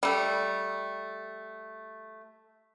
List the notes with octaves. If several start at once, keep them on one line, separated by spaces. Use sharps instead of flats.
G3 A3